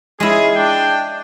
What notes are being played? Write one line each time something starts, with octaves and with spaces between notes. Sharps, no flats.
G#3 C#4 E4 F4 G#4
D4 G5